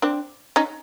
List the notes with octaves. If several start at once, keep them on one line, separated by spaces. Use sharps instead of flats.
C4 D4
C#4 D#4